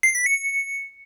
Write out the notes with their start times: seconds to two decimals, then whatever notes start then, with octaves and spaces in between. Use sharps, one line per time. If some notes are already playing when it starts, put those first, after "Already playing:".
0.03 C7
0.15 B6
0.26 C#7